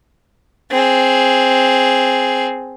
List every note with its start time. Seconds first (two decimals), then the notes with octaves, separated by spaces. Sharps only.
0.71 C4 G#4